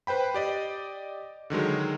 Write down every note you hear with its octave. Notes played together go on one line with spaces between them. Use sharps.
B4 C5 G5 B5
G4 D5 D#5
D3 D#3 F#3 G#3